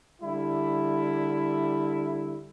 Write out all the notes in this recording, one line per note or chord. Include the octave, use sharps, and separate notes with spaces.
D3 G3 E4